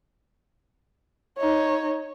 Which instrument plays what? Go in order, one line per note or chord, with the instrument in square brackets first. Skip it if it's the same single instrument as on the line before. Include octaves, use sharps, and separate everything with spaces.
[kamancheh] D#4 C#5